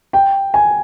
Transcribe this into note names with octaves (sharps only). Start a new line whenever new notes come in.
G5
G#5